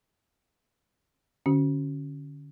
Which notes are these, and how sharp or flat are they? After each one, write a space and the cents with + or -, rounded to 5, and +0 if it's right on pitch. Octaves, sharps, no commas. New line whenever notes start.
D3 +0 C#4 +0 F#4 +20